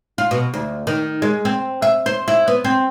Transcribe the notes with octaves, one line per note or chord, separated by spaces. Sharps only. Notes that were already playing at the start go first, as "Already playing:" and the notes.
F4
B2
D2
D#3
G#3
C4
E5
C5
E4
B3
C4